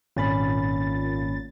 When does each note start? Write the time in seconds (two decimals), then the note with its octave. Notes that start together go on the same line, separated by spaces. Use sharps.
0.17 G#1 A#2 C#4 B5 A6